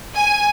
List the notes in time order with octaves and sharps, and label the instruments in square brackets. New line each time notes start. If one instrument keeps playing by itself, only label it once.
[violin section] G#5